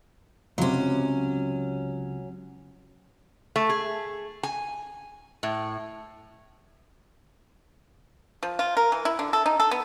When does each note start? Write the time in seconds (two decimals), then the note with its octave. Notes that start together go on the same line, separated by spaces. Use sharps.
0.58 C#2 C3 F#3 C#4
3.56 A3
3.70 G#4
4.43 G#5
5.43 A2
8.43 F3
8.59 F4
8.77 A#4
8.92 E3
9.05 E4
9.19 D3
9.33 A4
9.46 D#4
9.60 A4
9.71 B3